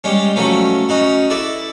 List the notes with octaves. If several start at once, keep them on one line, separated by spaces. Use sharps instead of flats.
G3 G#3 C#4
F3 F#3 A3 C#4
C#4 D#4 F#4
E4 A4 D5